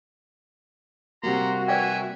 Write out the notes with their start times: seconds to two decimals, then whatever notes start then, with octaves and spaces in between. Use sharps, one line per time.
1.23 C3 G3 A#3 F#4 A#5 C6
1.68 B4 D5 E5 G5 G#5